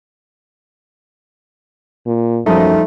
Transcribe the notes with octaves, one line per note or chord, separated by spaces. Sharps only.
A#2
F#2 F3 G3 A3 D#4